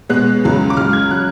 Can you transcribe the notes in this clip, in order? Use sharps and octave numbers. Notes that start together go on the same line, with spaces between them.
B2 G#3 B3 F#6
C#2 C#3 F#3
D6
C#2 C#3 F#3 F6
G#6
C#3 F#3 F#6